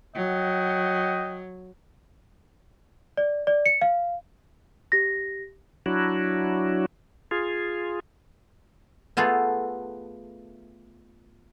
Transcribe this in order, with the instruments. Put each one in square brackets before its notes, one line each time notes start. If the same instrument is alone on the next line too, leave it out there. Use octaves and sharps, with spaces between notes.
[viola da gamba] F#3 [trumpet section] D#5 F#5 G5
[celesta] D5
D5
C#7
F5
G4 A#6
[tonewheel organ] F#3 D4 E4 F#4
F4 G#4
[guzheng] A3 B3 F4 G#4 A4